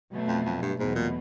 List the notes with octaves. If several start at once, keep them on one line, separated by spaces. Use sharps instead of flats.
B2 F#3 A3
F2
F2
G2
E2 G#2 B2 F#3 A3
A#2